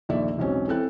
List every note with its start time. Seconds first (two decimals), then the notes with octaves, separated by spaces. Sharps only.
0.09 A#1 D#2 A3 D5 E5
0.37 E1 B1 C4 C#4
0.68 E3 C4 A4 G5 F#6